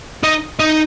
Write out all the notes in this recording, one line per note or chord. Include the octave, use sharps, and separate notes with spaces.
D#4
D#4